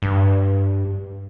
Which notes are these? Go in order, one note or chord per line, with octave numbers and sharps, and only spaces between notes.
G2